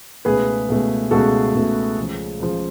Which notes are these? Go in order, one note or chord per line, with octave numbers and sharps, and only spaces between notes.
C#2 B2 A3 G#4 B4
C#2 B2 A3
C#2 B2 A3 F#4 A4
C#2 B2 A3
C#2 C#3 F3
C#2 C#3 F3